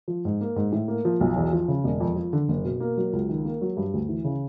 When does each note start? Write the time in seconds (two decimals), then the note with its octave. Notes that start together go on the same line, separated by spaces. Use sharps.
0.08 F3
0.25 G#2
0.41 A#3
0.56 G#2
0.72 A2
0.88 A#3
1.05 F3
1.21 B1
1.36 E2
1.53 F3
1.68 C#3
1.84 E1
2.00 F2
2.16 F3
2.33 D3
2.49 F#1
2.65 B2
2.80 A#3
2.97 F#3
3.13 C#2
3.29 D#3
3.45 A#3
3.61 F#3
3.77 G2
3.93 D2
4.09 E3
4.24 C#3